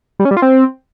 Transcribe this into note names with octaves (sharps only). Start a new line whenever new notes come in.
G3
C#4
G3
F4
C4